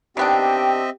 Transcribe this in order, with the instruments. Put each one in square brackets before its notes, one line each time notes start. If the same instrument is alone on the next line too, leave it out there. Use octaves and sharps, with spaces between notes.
[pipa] D#3 B3 D4 [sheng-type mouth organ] C4 D#5 E5 [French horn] G4 [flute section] G5